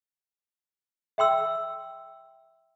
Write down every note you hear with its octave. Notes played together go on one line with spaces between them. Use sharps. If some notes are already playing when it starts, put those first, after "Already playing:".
E5 G5 C6 E6